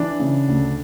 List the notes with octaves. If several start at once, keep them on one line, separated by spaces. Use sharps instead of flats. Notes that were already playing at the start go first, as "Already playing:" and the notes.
Already playing: E3 D4
C#3
D2